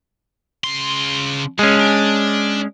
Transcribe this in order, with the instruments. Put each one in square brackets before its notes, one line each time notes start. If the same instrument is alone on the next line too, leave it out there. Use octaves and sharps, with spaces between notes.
[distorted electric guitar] C#3 C6
[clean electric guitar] G#3 C#4 [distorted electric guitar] G#4 A4
[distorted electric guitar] D4